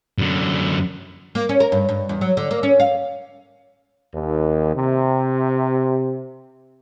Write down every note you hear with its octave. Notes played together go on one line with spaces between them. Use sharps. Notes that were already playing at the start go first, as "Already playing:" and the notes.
F#2 D3
A#3
C#4
A#4
G2
G2
E2
F#3
D3
A#3
C#4
F5
D#2
C3